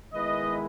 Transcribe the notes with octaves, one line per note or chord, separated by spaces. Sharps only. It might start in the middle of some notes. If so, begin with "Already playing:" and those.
D#3 G#3 B3 E4 B4 D#5